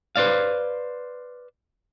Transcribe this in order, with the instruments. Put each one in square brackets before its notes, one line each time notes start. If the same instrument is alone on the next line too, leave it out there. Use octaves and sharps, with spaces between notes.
[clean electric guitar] B4 C5 D5 F5